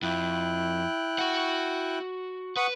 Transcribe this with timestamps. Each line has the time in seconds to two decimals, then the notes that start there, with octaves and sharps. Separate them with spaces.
0.03 F2 E4 G5 F#6
1.19 F#4 F#5
2.57 B4 F#5 C#6 D#6